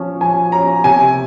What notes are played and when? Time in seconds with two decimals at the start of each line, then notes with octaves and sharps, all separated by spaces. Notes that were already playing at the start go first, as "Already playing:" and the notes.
Already playing: F3 C#4
0.21 F3 G#5
0.52 C#4 A#5
0.84 C3 G#5